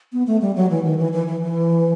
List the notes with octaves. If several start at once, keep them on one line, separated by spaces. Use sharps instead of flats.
B3
A3
G3
F#3
E3
D#3
E3
E3
E3
E3